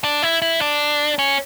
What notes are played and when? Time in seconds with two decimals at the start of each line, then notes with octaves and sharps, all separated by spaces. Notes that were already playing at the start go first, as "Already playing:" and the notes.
0.04 D4
0.22 E4
0.42 E4
0.61 D4
1.19 C#4